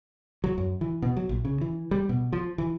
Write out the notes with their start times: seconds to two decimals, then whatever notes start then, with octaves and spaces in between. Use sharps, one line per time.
0.44 F#3
0.58 F#2
0.81 E3
1.02 B2
1.17 F#3
1.29 A#1
1.45 C#3
1.61 E3
1.91 G3
2.09 B2
2.33 F3
2.58 E3